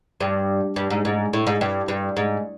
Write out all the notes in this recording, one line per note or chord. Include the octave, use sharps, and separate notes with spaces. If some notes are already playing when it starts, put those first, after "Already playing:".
G2
G2
G#2
G#2
A2
G#2
G2
G2
G#2